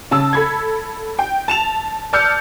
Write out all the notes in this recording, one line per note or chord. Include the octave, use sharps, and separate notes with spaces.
C#3 A5 E6
A4 B5 G#6
G5
A5 E7 F7
D5 A5 E6 F6 G6 C#7